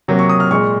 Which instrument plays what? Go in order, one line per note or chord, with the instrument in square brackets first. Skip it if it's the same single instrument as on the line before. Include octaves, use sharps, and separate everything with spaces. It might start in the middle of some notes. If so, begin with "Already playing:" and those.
[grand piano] C3 F#3 A#3
C#6
D#6
F6
A#2 G#3 C#6